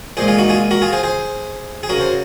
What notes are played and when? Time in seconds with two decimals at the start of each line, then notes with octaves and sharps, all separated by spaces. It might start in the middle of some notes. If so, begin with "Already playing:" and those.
0.17 A#2 G#3 G#4 C5
0.28 F4 G#4
0.38 D#4 F#4
0.49 F4 G#4
0.71 F#4 A#4
0.82 F4 G#4
0.92 G#4 C5
1.03 G#4 C5
1.83 G#4
1.89 C#3 F#3 F#4 A#4
2.01 C5